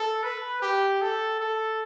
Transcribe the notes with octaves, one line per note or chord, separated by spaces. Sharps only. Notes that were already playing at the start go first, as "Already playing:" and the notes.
Already playing: A4
B4
G4
A4
A4